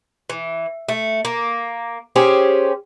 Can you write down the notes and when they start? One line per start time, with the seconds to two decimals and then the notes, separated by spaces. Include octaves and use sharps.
0.30 E3
0.88 A3
1.25 A#3
2.16 C#4 G4 G#4 C5